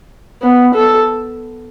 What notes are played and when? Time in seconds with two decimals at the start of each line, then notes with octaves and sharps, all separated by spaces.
0.42 B3
0.75 A4